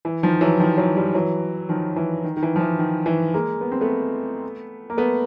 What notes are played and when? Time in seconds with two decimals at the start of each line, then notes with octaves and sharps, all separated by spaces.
0.05 E3
0.23 D#3 F3
0.41 E3 F#3
0.60 D#3 F3
0.78 E3 F#3
0.96 F3 G3
1.14 E3 F#3
1.69 D#3 F3
1.96 E3
2.24 D#3
2.37 D#3
2.43 E3
2.56 F3
2.61 E3
2.79 D#3
3.06 E3
3.34 G#3 A#3
3.61 B3
3.72 C4
3.81 A3 B3
4.90 A#3
4.97 A3 B3